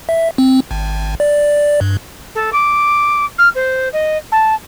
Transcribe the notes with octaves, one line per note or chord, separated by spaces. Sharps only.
E5
C4
G#1
D5
G2
A4
D6
F6
C5
D#5
A5